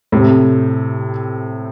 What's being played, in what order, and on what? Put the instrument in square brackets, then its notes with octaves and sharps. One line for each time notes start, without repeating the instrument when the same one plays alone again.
[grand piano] A2 C3